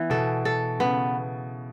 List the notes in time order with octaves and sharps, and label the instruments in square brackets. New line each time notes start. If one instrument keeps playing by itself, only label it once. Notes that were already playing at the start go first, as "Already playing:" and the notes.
Already playing: [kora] E3 B3
[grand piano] B2 [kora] A4
[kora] A4
[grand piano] C#3 [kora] B3